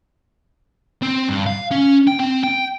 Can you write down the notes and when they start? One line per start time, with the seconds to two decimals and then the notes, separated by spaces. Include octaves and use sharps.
1.03 C4
1.29 G2
1.46 F5
1.71 C#4
2.08 G5
2.20 C4
2.44 G5